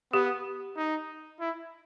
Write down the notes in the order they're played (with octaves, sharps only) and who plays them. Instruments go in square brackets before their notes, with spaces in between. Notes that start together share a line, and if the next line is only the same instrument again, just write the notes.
[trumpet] B3 [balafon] G4
[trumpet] D#4
E4